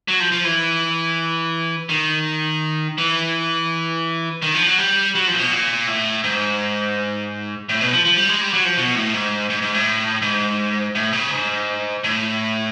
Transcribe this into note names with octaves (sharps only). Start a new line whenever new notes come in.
F#3
F3
F3
E3
D#3
E3
D#3
F3
F#3
G3
F#3
F3
A#2
B2
A#2
A2
G#2
A2
B2
F3
F3
G3
G#3
G3
F#3
F3
B2
A2
G#2
G#2
G#2
A2
G#2
A2
C#3
G#2
A2